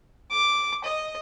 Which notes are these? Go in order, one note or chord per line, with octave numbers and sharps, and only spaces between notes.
D6
D#5